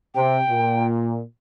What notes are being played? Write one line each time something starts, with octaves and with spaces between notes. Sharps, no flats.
C3 G5
A#2